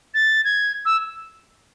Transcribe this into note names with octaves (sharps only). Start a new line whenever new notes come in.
A6
G#6
E6